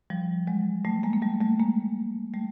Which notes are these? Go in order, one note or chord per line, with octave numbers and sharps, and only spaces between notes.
F3 G3
F#3 G#3
G3 A3
G#3 A#3
A#3
G3 A3
G3 A3
G#3 A#3
G3 A3